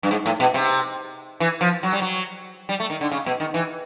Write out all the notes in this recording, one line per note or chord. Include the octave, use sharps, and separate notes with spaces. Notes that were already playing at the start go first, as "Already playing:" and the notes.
G2
G#2
A2
B2
C3
E3
F3
F#3
G3
F#3
G3
A3
D#3
D3
C#3
B2
D#3
E3